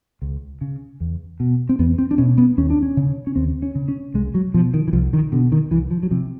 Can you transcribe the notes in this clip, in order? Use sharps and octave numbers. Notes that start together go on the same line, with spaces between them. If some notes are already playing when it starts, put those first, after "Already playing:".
C#2
C#3
E2
B2
C4
E2 B3
C4
D4
B2 C#4
B3
D#2 C#4
D4
C#4
C#3
C#4
D#2 C4
C#4
C#3
C#4
C2 G#3
F#3
B2 F3
D#3
E3
C2 F3
D#3
B2 D3
D#3
C2 E3
F3
F#3
C3 F3